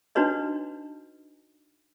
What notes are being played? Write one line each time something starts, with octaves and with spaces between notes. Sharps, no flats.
D4 D#4 F#4 B4 C#5 D#5